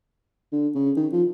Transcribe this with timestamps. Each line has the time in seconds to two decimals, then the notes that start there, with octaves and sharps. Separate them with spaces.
0.52 D3
0.75 C#3
0.97 D#3
1.12 F3